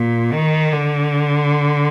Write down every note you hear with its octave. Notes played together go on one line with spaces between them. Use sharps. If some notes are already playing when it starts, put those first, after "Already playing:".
Already playing: A#2
D#3
D3